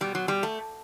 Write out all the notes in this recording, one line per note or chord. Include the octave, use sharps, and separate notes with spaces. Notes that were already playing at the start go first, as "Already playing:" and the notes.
B2 G3
F#3
G3
A3